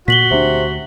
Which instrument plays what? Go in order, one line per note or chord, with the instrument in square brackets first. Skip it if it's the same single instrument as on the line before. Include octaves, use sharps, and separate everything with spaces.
[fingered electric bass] A#2 [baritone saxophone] F#4 [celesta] B6 F#7 G7
[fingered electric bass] D2 D4 [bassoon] C3